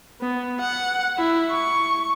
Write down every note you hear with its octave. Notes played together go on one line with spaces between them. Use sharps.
B3
F#5
E4
C#6